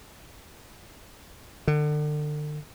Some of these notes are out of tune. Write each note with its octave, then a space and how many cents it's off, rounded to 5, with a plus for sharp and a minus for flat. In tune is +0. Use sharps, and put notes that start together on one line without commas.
D3 +35